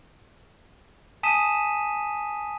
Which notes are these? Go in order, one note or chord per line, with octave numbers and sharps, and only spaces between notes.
G#5 A5 D#6 B6 D#7 E7